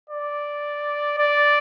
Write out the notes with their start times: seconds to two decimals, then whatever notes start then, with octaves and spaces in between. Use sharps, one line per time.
0.10 D5
1.18 D5